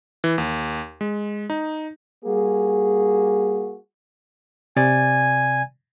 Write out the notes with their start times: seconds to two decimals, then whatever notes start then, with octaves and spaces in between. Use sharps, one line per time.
0.24 E3
0.38 D#2
1.01 G#3
1.50 D#4
2.25 G3 A#3 F#4 G#4
4.77 C3 D5 G#5 A6